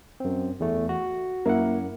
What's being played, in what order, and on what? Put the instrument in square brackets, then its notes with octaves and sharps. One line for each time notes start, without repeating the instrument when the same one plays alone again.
[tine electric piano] F#2 C4
E2 A3
F#4
[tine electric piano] F#2 F#5 [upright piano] A#3 E4